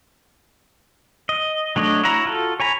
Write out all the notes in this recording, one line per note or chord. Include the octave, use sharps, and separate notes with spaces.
D#5
F#3 A3 D4 C#5 D#5
E4 F#4 C#5 A#5
F4 F#4 A4
C#5 G#5 A#5 B5